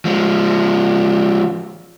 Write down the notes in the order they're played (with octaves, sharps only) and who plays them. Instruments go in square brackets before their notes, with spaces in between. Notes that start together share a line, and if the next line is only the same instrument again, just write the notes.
[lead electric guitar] F3 G#3